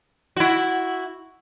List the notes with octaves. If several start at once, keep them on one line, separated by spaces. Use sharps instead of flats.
E4 F#4